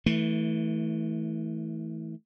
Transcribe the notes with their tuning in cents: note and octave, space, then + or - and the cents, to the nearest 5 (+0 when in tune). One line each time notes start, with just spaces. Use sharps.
E3 -20 A3 +0